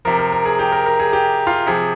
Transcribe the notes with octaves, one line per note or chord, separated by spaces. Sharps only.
C3 F3 A#4
A#4
A#4
G#4
G4
A#4
A#4
G#4
G4
F4
C3 F3 G#4